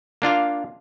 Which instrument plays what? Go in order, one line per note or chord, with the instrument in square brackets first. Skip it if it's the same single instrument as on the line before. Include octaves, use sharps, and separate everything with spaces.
[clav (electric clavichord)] A#3 D4 F4 F5